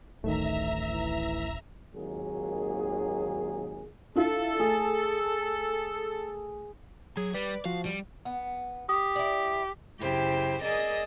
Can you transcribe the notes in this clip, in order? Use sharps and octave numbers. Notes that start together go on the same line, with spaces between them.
D1 A1 D#3 A3 D#4 E5 A#5
E3
G#1 D#2 A#2 F#3 G#4
D4 E4 F4 A4
A3 G#4
F#3 G#4 G#6
G3 B4 D5
F3 F#4 F5
G3
B3
G4 D#6
E4 D5
F#2 C#3 E4 G4 C5 G5
G#4 A#4 D5 D#5 D#6 E6